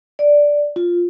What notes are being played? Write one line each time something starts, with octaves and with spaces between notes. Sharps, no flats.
D5
F4